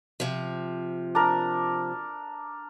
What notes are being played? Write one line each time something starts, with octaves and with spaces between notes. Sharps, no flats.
C3 F3
D4 A#4